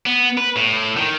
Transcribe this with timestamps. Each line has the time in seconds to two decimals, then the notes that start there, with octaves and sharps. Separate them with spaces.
0.06 B3
0.37 B4
0.56 A2
0.97 D#3